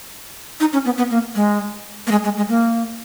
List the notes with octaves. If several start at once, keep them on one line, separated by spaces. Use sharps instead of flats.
D#4
C#4
B3
B3
A#3
G#3
A#3
G#3
G#3
G#3
A#3